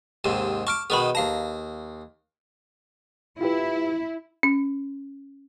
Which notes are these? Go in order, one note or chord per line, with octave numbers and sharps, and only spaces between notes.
D#2 G#2 C3
A5 C#6 D6 F6 D7
B2 D#3 B3 G#4 B4 B5
D#2 F5 A5 A#5
E4 F4 G4 B4
C#4